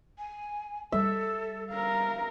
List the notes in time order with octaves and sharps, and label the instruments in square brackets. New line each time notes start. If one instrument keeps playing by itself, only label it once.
[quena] G#5
[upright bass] G3 [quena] A4 [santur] E5
[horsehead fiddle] A#4 F5 [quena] A#5